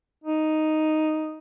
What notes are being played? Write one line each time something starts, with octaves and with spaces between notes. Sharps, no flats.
D#4